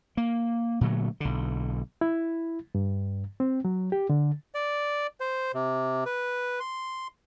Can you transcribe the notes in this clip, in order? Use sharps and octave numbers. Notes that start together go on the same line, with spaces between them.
A#3
A#2 D3 F#3 A3
B1 D3
E4
G2
C4
F#3
G4
D3
D5
C5
C3
B4
C6